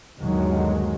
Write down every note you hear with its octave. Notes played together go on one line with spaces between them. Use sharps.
G1 D#2 D#3 F#3 G#3